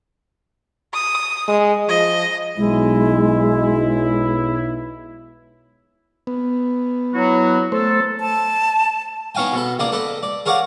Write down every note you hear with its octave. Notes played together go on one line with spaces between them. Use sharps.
D#6
G#3
F3 D#5
B1 G#3 E4
B3
F#3 E4 F#4
A3 A4 C5
A5
B3 D#4 C#5 F5 G5 G#5
B2 B3 A4
C#2 A#3 D#4 D5 D#6
A4 B4 D5 D#5
D5
G#4 A#4 C#5 D5 F5 F#5